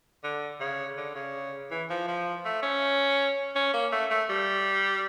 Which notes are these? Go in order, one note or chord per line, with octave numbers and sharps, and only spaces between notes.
D3
C#3
D3
C#3
E3
F3
F3
A3
C#4
C#4
A#3
A3
A3
G3